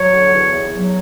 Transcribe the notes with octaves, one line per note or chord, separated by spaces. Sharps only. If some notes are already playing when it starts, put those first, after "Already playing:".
Already playing: F#3 C#5
D3
E2
E2
F#3